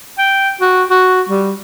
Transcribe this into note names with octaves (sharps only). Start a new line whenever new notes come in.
G5
F#4
F#4
G3